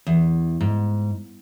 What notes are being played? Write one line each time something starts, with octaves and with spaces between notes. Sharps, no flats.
E2
G#2